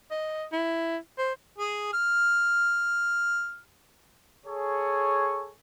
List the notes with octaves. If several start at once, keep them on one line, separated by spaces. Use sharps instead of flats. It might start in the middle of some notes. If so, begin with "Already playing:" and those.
D#5
E4
C5
G#4
F6
G#4 A4 C#5